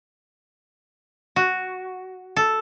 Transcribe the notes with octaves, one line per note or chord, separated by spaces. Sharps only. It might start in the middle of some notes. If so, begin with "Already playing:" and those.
F#4
A4